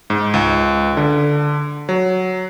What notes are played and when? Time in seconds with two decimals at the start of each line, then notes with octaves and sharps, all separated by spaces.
0.10 G#2
0.34 C#2
0.97 D3
1.89 F#3